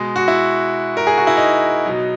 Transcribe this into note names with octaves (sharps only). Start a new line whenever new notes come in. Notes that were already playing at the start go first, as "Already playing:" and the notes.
Already playing: B2 G#3
F#4
E4
A#4
G#4
F#4
E4
D#4
B2 F#3